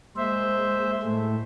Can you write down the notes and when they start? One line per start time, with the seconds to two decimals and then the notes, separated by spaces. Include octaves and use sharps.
0.17 G#3 A#3 C5 E5
1.03 A2 A3